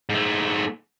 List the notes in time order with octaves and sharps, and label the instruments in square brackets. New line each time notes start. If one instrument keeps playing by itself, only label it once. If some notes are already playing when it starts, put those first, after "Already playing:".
[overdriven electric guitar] G#2 A3